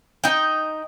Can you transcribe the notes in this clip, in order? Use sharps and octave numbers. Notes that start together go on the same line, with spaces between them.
D#4 G5